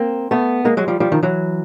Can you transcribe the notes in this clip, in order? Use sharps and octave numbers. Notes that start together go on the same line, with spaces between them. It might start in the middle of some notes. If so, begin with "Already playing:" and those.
Already playing: A#3 C4
A3 B3
G#3 A#3
F#3 G#3
F3 G3
F3 G3
D#3 F3
E3 F#3